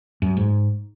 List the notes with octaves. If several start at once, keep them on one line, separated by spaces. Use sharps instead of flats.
F#2
G#2